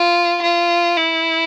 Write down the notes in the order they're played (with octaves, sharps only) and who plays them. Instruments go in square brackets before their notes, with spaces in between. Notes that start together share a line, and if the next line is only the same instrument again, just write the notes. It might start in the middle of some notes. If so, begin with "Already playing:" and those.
Already playing: [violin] F4
F4
E4